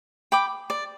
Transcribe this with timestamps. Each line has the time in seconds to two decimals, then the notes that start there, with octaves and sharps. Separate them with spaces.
0.32 G5 B5 D6
0.70 D5